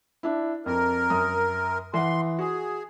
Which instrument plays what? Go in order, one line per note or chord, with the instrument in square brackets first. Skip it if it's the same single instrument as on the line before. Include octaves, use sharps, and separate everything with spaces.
[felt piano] D4 E4
[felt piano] F2 [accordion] A#4
[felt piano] F#2 D#6
[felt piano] E3 F#5 [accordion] C6
[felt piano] F#4 [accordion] G#4